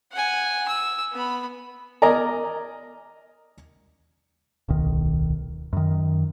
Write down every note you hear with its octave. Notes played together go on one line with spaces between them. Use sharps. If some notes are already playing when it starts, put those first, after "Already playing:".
F#5 G#5
E6
B3 B5
A#4 D5 D#5 G#5 A#5
D1 B1 D#3
F#2 D#3